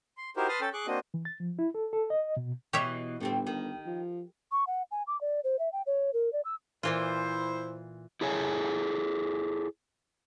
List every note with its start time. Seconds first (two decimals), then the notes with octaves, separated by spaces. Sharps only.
0.17 C6
0.37 D#4 E4 F#4 G4 A#4 C5
0.48 B4 A5 C6 D#6 F6
0.61 C#4 A4 G5 A5
0.73 G#4 C#6 D6 F#6
0.87 A#3 C4 D4 F#4 D#5
1.14 E3
1.25 A6
1.40 F3
1.59 E4
1.75 A4
1.93 A4
2.10 D#5
2.37 B2
2.73 B2 E3 G4 C#5 E5
3.20 G1 A2 G3 C4
3.47 D#3
3.86 F3
4.52 C#6
4.67 F#5
4.91 G#5
5.07 D6
5.21 D5
5.44 C5
5.59 E5
5.73 G5
5.87 C#5
6.14 A#4
6.33 D5
6.45 E6
6.83 A#2 E3 E4 F4 C5
8.21 E4 G#4 A4 C#5 G#5